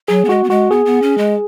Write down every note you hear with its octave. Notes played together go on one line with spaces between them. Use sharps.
F#3 G#4
B3
G#3 F#4
B3
G#3 F#4
B3 G#4
B3
C#4
G#3